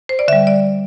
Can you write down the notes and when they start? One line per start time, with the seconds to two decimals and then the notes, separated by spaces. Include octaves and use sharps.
0.09 C5
0.19 D5
0.28 D3 E5
0.33 G3
0.47 D5